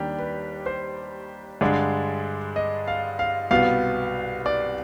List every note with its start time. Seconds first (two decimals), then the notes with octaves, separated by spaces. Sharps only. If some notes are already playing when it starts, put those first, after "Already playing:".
Already playing: D#2 D#3 G3 D4 G4
0.18 B4
0.66 C5
1.61 G2 D3 G#3 D4
2.56 D#5
2.87 F5
3.19 F5
3.51 C2 B2 B3 F5
4.46 D5